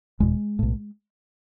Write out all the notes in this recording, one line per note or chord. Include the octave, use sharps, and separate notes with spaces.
F#1 E2 B2 G#3
B1 A2